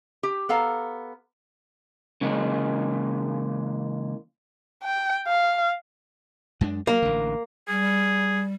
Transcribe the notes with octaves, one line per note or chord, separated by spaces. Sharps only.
G4
B3 A4 F5 A#5
C#3 E3 G#3 A#3
G5
F5
F#2 G#3 D4
F#3 A#3
A1 D3
G3 G#4